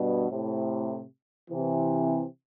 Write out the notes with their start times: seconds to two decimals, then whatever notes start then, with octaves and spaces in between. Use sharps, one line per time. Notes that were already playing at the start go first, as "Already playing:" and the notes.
Already playing: G2 B2
0.30 A2 C3
1.51 C3 E3